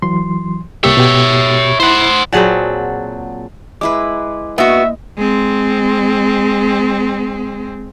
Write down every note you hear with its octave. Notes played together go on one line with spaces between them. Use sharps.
E3 F#3 C6
C2 A#3 G4 C#5 E5
B2 F#4 G4
E4 C5 F#5 B5 C6
A#2 F#3 C4 G#4 F#5 A5
G#3 E4 B4 D6
A#3 B3 F#4 D#5 E5
G#3 C4